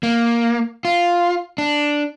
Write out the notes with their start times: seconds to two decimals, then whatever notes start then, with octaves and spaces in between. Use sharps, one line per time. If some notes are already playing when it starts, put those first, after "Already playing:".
0.03 A#3
0.85 F4
1.58 D4